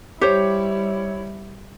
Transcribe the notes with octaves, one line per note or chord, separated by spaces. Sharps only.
G3 E4 G4 C5 C#5